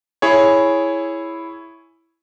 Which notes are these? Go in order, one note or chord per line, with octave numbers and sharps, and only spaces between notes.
E4 G#4 C#5